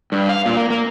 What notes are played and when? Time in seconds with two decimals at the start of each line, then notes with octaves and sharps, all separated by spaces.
0.12 G2
0.29 F5
0.45 A#2
0.57 A#3
0.70 A#3